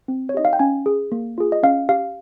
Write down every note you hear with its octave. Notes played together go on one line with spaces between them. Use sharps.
C4
C#5
D#4 G4 D#5
F5
G5
C#4 G#5
G#4
A#3
F4 G#4
D#5
C#4 F5
G4 F5